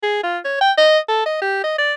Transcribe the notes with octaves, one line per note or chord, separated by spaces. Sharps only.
G#4
F4
C#5
G5
D#5
A4
D#5
G4
D#5
D5